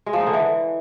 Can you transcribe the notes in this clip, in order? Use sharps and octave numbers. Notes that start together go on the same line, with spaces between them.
G#3
F3
D#4
D3
E3